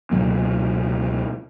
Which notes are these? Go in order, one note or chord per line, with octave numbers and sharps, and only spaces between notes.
C#2 B2 F#3 A#3